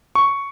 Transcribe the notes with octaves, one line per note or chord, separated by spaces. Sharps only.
C#6